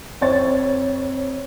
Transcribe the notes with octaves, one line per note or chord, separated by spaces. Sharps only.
F2 C5 C#5 A6